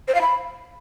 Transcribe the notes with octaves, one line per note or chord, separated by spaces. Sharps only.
C5
F5
B5